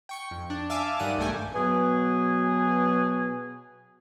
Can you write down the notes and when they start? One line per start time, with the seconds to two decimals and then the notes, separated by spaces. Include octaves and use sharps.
0.09 G5 C#6 C#7
0.31 F2
0.50 D4
0.70 E5 F5 G#5 A5 D6
0.99 G2 D#3 D5 F#5 D#7
1.18 B1 G2 A3 G4 G#5
1.54 B2 F#3 G#4 B4 G#5